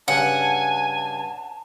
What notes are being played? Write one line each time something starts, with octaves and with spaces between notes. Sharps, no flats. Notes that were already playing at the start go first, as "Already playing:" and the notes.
G2 C#3 F#5 G#5 A5